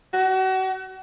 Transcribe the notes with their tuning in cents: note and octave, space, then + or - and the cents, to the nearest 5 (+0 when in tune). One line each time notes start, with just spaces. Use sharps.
F#4 +35